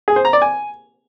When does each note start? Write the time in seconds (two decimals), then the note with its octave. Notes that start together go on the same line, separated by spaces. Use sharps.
0.08 G#4
0.16 C5
0.25 A#5
0.33 D5
0.42 G#5